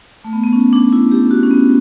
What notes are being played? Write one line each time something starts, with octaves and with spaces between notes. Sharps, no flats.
A3
B3
B3
C#4
D4
E4
G4
F#4
C#4
B3